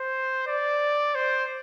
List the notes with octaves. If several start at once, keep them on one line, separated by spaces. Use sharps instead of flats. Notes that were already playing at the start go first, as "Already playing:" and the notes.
Already playing: C5
D5
C5